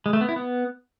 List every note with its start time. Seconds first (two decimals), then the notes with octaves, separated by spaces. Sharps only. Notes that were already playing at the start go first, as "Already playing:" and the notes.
0.06 G#3
0.13 A3
0.21 B3
0.29 E4
0.36 B3